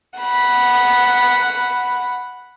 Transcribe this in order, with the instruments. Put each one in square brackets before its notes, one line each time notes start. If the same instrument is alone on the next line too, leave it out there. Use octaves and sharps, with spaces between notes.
[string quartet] F#5 B5